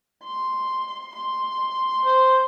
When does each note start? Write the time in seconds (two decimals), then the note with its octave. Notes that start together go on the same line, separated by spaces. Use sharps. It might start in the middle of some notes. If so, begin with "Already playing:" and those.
0.24 C6
1.15 C6
2.05 C5